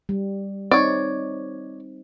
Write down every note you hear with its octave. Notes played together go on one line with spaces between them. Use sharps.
G3
C4 D#4 C#5 D5